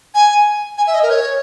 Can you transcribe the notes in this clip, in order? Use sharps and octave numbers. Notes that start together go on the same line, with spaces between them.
G#5
G#5
E5
D#5
A#4
C#5